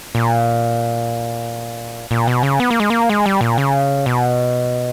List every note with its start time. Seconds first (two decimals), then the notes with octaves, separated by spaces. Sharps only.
0.15 A#2
2.11 A#2
2.28 B2
2.43 C#3
2.60 B3
2.71 A#3
2.80 G#3
2.90 A#3
3.09 G#3
3.26 G3
3.41 A#2
3.58 C#3
4.06 B2